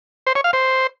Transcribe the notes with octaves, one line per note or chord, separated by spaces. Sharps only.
C5
C#5
F5
C5